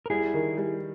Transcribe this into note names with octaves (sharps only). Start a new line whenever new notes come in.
A#4
G3 E4 G#4
D#3
G3